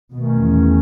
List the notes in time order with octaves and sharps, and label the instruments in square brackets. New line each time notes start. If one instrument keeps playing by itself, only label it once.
[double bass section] B2 [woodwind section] D#3 A3 C#4
[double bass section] E2